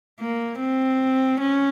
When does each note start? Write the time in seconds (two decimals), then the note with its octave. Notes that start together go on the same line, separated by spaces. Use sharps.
0.20 A#3
0.60 C4
1.40 C#4